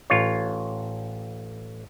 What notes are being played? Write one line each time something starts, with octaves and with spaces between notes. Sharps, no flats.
A1 F4 C#5